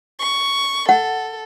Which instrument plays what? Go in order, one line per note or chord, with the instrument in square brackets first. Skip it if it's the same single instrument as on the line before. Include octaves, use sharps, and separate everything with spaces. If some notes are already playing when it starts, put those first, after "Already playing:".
[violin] C#6
[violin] A4 [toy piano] F#5